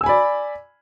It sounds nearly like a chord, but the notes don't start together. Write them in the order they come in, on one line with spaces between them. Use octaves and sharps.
E6 G#5 B5 D5